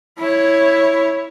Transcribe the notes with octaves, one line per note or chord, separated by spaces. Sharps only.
E4 C#5